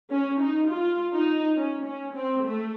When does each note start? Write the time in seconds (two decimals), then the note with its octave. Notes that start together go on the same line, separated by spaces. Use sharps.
0.11 C#4
0.40 D#4
0.69 F4
1.13 D#4
1.57 C#4
1.85 C#4
2.15 C4
2.44 A3